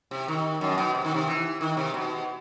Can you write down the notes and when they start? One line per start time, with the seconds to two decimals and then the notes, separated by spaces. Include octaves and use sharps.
0.11 C3
0.28 D#3
0.61 F#2
0.78 B2
0.95 C3
1.04 D#3
1.14 C3
1.27 E3
1.61 D#3
1.77 C3
1.94 B2